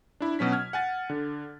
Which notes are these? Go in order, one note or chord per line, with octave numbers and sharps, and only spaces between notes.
D4 E4
B2 F#3 C#4 B6
F6 G#6
F#5 G#5 A6
D3